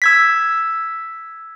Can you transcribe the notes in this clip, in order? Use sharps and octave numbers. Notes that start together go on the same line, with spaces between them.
E6 G#6 B6